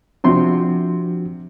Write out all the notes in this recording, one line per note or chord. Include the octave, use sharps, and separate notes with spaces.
C3 F3 D4 F#4 C6